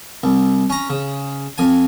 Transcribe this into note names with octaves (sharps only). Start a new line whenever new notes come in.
C2
C#4 A#5
C#3
F2 G#5